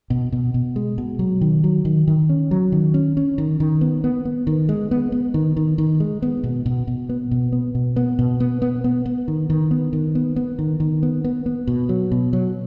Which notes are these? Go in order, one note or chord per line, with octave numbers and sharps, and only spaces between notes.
B2
B2
B2
G#3
B2
F#3
D#3
F#3
D#3
D#3
C#4
F#3
D#3
C#4
C#4
D#3
D#3
B3
B3
B3
D#3
G#3
B3
B3
D#3
D#3
D#3
G#3
B3
B2
B2
B2
B3
B2
B3
B2
B3
B2
B3
B3
B3
B3
D#3
D#3
B3
D#3
B3
B3
D#3
D#3
B3
B3
B3
B2
F#3
B2
F#3